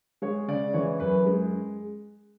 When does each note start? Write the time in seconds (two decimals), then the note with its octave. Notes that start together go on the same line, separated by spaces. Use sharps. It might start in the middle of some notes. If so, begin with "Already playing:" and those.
0.22 G#3 C#5
0.48 C#3 D5
0.74 E3 C#5
1.00 F#2 B4
1.26 G#3